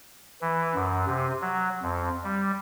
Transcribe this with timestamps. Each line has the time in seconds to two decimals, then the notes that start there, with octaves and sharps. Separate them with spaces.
0.41 E3
0.75 F#2
1.07 C3
1.42 F#3
1.82 F2
2.24 G3